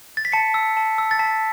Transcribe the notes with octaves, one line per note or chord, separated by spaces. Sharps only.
A6
B6
A5 C#7
E6
A5
E6
A6
A5 B6